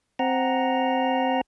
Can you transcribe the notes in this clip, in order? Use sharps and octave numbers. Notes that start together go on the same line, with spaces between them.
C4 F#5 A#5